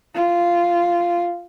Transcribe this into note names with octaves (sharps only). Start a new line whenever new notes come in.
F4